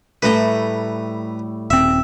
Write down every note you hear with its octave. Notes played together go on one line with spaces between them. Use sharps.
A2 G3 A3 B4 A#5
D#1 C4 E5